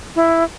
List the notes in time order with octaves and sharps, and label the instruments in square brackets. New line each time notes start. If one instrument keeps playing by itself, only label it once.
[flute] E4